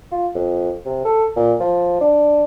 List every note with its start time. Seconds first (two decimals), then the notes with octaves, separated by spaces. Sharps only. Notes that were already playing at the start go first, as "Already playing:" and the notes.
0.12 F4
0.35 F2
0.86 C3
1.05 A4
1.36 A#2
1.60 F3
2.01 D4